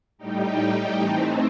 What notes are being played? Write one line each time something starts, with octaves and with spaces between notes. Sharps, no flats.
A2 G3 D#4 G4
A2 E3 A3 C4 D#4